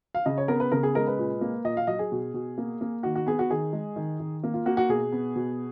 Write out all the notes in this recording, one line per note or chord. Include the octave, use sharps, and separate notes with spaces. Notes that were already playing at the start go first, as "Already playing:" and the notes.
F5
C#3 D#5
C#5
B3 A#4
B4
C#3 A#4
G#4
G#3 A#4
B4
A#2
A#3
A#2 D#5
F5
F#3 D#5
G#4
B2
B2
A#3
A#3
D#3 F#4
F#4
B3 G#4
F#4
D#3 G#4
G#3
D#3
D#3
A#3
F4
A#3 F#4
F#4
B2 G#4
B3
B2